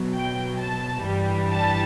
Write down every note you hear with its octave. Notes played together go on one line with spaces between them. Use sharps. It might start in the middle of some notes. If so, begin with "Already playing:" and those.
Already playing: B2 F#3
G5
A5
G2 E3 G3
A5